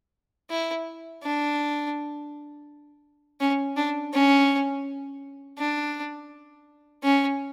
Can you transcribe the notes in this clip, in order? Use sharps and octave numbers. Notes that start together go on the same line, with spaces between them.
E4
D4
C#4
D4
C#4
D4
C#4